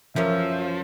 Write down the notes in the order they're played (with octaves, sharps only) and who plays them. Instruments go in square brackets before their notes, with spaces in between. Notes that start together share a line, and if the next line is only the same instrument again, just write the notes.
[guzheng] F#2 E3 C#4 [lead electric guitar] F3 [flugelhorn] E5